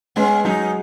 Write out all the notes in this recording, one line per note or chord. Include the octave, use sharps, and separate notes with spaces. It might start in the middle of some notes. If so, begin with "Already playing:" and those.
G#3 B3 C#4
F#3 C#4 D#4